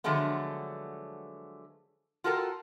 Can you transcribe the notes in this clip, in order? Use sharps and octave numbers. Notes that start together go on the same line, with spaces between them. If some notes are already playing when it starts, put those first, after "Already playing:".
D3 F3 F#3 G#3 A3 B3
F4 F#4 A4 A#4 G5